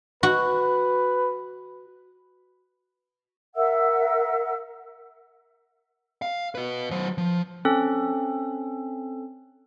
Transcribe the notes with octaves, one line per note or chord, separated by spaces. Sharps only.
F#4 B4
A#4 E5 F#5 E6
F5
F#4 B4
F#3 C5
F3
C4 C#4 A4